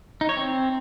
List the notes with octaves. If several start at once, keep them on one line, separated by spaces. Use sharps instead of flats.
D#4
C#5
C4